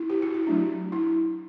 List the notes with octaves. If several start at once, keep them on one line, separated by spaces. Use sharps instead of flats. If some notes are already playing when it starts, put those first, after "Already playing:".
Already playing: E4
G4
F#4
E4
F#3 A3 D4
E4